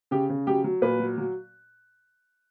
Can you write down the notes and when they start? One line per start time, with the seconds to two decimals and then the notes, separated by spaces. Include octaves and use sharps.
0.11 C#3 G4
0.29 C#3
0.47 F#3 G4
0.64 F#3
0.82 A#2 B4
0.99 F#3
1.18 F#3